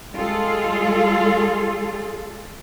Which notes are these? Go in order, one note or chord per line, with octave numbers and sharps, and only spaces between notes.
G3 G#3 F4 G#4 A4